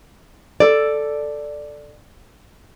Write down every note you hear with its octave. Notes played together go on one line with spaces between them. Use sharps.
A4 D5